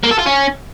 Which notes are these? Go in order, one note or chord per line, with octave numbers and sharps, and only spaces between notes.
A#3
A4
F4
C#4